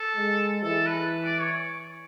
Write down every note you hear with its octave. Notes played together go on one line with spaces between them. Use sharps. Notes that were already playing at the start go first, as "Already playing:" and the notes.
Already playing: A4
G#3
E3 A4
B4
D5
C#5